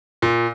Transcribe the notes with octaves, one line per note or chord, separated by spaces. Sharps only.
A#2